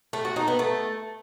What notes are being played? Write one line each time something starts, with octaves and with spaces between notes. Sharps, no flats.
A3
F#4
D#4
B3
A3